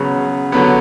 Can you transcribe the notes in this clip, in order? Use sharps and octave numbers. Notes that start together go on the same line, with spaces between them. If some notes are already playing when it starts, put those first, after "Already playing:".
Already playing: C#3 F#3 B3
D3 F#3 B3